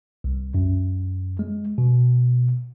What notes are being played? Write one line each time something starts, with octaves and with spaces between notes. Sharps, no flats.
C2
F#2
G#3
B2